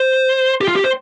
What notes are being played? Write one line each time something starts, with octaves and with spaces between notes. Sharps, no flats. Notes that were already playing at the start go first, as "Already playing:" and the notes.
Already playing: C5
G4
F4
G4
C5